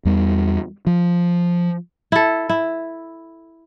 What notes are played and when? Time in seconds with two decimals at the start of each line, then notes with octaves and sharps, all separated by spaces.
0.05 E2 G3
0.87 F3
2.12 E4 A4
2.49 E4